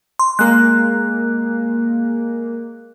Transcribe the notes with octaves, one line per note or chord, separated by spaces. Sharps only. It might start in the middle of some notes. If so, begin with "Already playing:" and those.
C6
G#3 A#3 F#6